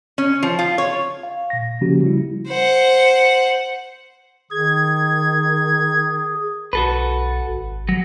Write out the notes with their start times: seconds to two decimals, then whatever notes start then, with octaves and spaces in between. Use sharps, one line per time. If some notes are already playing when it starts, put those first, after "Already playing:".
0.18 C#4
0.43 F3
0.59 F4
0.78 C#5
1.23 F5
1.50 A#2 A#6
1.81 C#3 F3 A#3 C#4 F#4 G4
2.04 G3 E4
2.48 C5 F#5
4.51 D#3 G#4 G#6
6.73 B1 F#4 A4 B4
7.48 G#1
7.89 F#3